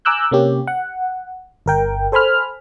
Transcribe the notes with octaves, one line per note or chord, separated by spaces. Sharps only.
G#5 A#5 D6 E6 F#6 G6
C3 A#3 C#4 G4
F#5
G1 A#4 G5
A4 C5 G#5 B5 F6